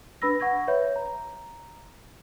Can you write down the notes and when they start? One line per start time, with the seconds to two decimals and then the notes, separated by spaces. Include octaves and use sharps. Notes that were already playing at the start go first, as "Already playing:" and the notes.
0.22 D4 B4 B5 E6 A#6
0.40 F#5 C#6 G#6 A#6
0.67 B4 C#5 E5 B5 G6
0.96 A#5